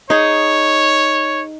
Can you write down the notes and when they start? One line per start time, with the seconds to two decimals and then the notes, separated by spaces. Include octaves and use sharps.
0.10 D#4 G#4 C#5